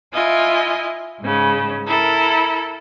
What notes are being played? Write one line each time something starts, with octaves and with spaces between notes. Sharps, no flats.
E4 F4 D#5 G#5
G#2 C#3
E4 A4 A#4